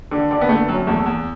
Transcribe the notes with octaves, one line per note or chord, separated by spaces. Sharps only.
D3
D3 D4
B3
D3 A3
F#2 F#3
E2 A3
E2